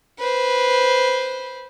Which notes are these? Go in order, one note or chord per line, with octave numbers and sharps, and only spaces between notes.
B4 C5